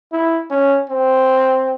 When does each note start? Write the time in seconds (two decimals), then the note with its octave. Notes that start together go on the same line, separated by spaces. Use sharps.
0.12 E4
0.50 C#4
0.90 C4